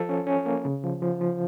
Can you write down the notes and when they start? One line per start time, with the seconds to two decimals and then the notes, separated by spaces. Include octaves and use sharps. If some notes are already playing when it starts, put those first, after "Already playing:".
Already playing: F3 A4
0.09 C#4
0.27 C#4
0.46 A#3
0.65 C#3
0.84 F3
1.02 F3
1.21 F3